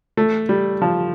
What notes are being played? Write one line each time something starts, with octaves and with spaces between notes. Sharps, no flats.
A3
G3
F3